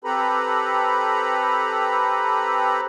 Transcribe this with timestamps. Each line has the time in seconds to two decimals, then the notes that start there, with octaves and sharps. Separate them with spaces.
0.04 C4 G4 A4 B4 A#5 B5